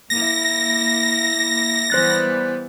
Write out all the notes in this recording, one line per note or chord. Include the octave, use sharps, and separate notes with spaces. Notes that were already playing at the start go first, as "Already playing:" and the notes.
A#3 E4 A#6
E3 G3 B3 C5 F#6 A6